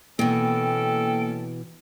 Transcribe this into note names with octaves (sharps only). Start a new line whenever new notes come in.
B2 E3 A#3 C#4 A4 G5